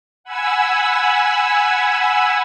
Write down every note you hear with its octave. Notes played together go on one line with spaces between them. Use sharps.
F#5 G#5 B5 E6